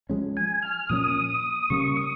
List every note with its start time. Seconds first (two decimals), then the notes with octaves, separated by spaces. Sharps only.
0.10 F3 G#3 C#4
0.37 G#5
0.62 F6
0.89 A#2 F3 A#3 C#4 D#6
1.70 C#3 G3 A#3 C#4 C#6
1.97 D#6